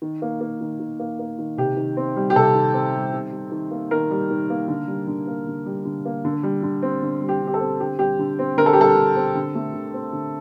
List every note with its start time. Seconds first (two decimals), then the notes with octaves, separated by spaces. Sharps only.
0.02 D#3
0.22 A#3
0.41 A#3
0.61 D#3
0.80 D#3
1.00 A#3
1.19 A#3
1.38 D#3
1.57 C3 G4
1.77 D#3
1.97 C4
2.16 G3
2.30 G4
2.35 C3 A4
2.55 D#3
2.74 C4
2.94 G3
3.13 D#3
3.32 G3
3.52 D#3
3.71 A#3
3.91 D#3 A#4
4.11 G3
4.31 D#3
4.50 A#3
4.68 D3
4.88 G3
5.08 D3
5.27 A#3
5.47 D3
5.66 G3
5.85 D3
6.05 A#3
6.25 D3
6.43 G3
6.63 D3
6.83 C4
7.03 D3
7.21 G3
7.29 G4
7.42 D3
7.47 G4
7.54 A4
7.60 C4
7.80 D3 G4
7.99 G3 G4
8.19 D3
8.39 C4
8.58 D3 A#4
8.66 A4
8.73 G4
8.77 G3 A4
8.97 D3
9.16 C4
9.35 D3
9.55 A3
9.74 D3
9.94 C4
10.13 D3